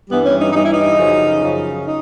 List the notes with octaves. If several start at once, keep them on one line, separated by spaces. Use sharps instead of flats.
G2 E3 G3 B3
C#4
D#4
G2 E3 G3 D#4
E4
D#4
F#2 C#3 F3
F#2 C#3 F3
D#4